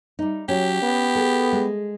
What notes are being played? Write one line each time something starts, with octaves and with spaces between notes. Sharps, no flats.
G3 D#4
F#3 C#4 G4
B3
G#4 A4
G#3